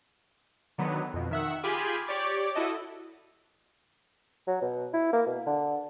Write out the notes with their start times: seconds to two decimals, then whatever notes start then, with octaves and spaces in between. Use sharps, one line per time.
0.78 D3 D#3 F#3 B3
1.14 F2 B2
1.31 D#3 E5 F#5
1.63 F4 G4 G#4 G#5 B5
2.08 G4 C#5 D5 D6
2.55 E4 F#4 A4 D#5
4.47 F#3
4.62 B2
4.94 E4
5.13 A#3
5.27 B2
5.47 D3